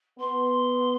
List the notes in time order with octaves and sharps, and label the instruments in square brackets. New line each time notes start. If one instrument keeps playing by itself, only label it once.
[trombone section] B3 [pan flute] C6